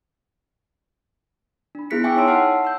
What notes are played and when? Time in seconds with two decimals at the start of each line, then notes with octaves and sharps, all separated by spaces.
1.75 D4 B5
1.90 B3 E4 G#4 F#6 B6 C#7
2.04 E5 G5 G#5 C#6 D6 E6
2.16 D#4 C#5 A5 C6 E6 D7
2.28 F#5 A5 C6 F6 C7
2.65 E6 G6